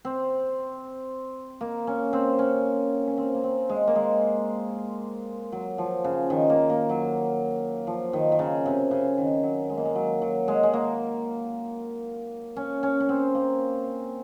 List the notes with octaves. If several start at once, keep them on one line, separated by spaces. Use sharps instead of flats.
C4
A#3
C#4
C4
C#4
C#4
C4
A#3
C4
G#3
A#3
G#3
F#3
F3
C#3
D#3
A#3
A#3
F#3
F3
D#3
D#3
C#3
C3
C#3
D#3
F#3
G#3
A#3
G#3
F#3
F#3
G#3
G#3
A#3
C#4
C#4
C#4
C4
A#3